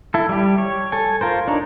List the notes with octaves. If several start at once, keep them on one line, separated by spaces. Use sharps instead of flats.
E4 A4
G3 G4
C#5
A4 G#5
F4 A#4 C5
D4 D#4 C#5